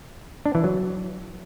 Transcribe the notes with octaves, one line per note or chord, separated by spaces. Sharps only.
D4
E3
F#3